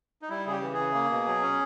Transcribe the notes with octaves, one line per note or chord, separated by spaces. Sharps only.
D#4
G3 E4
C#3 G#4
G4
E3
C#3 G#4
A#3
B2
F#3
C#4